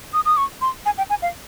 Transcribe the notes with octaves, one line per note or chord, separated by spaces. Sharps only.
D#6
D#6
C#6
C6
G#5
G5
G#5
F5